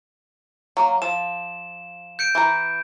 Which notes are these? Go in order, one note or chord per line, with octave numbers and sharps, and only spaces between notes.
F#3 A#3
F3 E7
G6 C#7 D7
E3 A#5